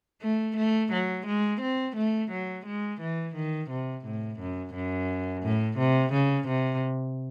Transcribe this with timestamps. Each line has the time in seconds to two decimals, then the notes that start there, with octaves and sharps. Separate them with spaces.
0.22 A3
0.57 A3
0.92 F#3
1.26 G#3
1.61 C4
1.96 A3
2.31 F#3
2.66 G#3
3.01 E3
3.35 D#3
3.70 C3
4.05 A2
4.40 F#2
4.74 F#2
5.43 A2
5.78 C3
6.13 C#3
6.48 C3